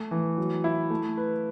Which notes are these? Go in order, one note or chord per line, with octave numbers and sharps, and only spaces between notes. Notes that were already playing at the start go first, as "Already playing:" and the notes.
Already playing: A3
E3
F#3
E4
A3
B4